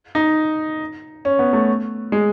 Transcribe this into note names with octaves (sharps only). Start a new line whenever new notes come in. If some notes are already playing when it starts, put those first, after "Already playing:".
D#4
C#4
B3
A3
G#3